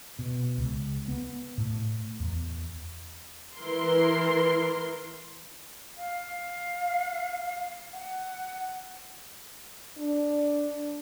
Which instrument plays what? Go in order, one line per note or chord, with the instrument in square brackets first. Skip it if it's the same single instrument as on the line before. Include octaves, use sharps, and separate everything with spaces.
[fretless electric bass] B2
C#2
B3
A2
E2
[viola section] E3 A#4 C6
[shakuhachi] F5
F#5
[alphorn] D4